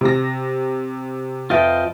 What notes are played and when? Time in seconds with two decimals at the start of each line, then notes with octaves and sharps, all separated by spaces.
0.01 C3 A#6
1.50 F2 F4 B4 D#5 E5 G5